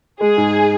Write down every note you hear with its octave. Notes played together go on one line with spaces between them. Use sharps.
G#3 G#4
G#2